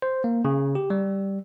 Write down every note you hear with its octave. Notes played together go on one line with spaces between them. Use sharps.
C5
A#3
C#3
G4
G3